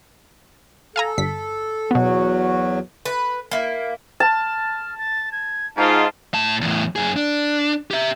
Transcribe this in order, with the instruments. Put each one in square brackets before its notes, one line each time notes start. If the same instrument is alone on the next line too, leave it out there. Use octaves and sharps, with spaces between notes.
[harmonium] A4 [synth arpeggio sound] F5 G#5 A#5
[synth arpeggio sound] G1 B6
[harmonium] E2 F#3 F#4 [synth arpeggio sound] B2 B3
[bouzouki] B4
A#3 E4
[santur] A5 [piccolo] F6
[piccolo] A6
G#6
[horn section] G#2 D#4 F4 [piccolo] A5
[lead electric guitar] A2 A5
E2 A2
F#2 G#4
D4
G4 E5